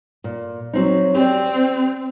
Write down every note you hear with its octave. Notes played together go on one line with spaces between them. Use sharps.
A#2
F#3 C4 D#4
C4 G4 D5